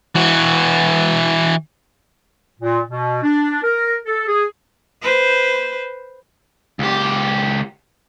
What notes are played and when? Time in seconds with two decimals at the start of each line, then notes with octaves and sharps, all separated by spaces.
0.15 E3 F#4
2.60 A#2
2.89 B2
3.23 D4
3.63 A#4
4.05 A4
4.27 G#4
5.02 B4 C5
6.79 C#2 G4